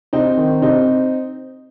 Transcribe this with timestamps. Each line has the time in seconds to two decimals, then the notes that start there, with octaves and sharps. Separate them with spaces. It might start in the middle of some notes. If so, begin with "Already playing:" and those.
0.13 C3 C4 D#4
0.37 D#3
0.62 C3 C4 D#4